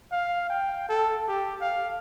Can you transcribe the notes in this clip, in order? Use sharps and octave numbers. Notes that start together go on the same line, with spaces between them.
F5
G5
A4
G4
F5